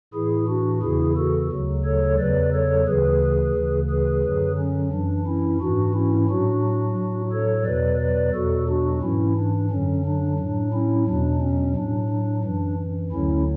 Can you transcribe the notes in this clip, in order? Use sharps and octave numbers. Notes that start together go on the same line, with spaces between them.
A2 E3 E4 G#4
D4 F#4
E2 C#3 E3 E4 G#4
F#4 A4
D2 C#3 F#3
A4 C#5
E2 C#3 F#3 B4 D5
A4 C#5
D2 C#3 E3 G#4 B4
D2 C#3 E3
G#4 B4
F#2 D3 F#3
C#4
F#2 E3 D4
C#4 E4
G#2 E3 D4 F#4
C#4 E4
A2 F#3 D4 F#4
A2 F#3
A4 C#5
E2 B2 F#3 B4 D5
B4 D5
E2 B2 F#3 F#4 A4
D4 F#4
G#2 E3 C#4 E4
D4
F#2 D3 F#3 C#4
D4
A2 F#3 D4
C#4 E4
E2 B2 F#3 D4
C#4
A2 F#3 D4
D4
F#2 E3 D4
D2 D3 F#3 C#4 E4